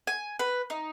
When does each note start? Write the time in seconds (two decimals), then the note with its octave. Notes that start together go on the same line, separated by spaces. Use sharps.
0.07 G#5
0.39 B4
0.70 D#4